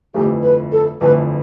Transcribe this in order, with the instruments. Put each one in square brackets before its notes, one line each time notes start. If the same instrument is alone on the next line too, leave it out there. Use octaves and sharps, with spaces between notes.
[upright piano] G1 F2 E3 A3 [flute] G4
[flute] B4
A4
[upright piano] G1 F2 E3 A3 [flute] B4